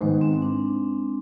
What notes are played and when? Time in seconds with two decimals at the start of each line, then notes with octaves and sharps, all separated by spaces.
0.01 G#2 D#3 G#3 B3
0.21 C4
0.42 D4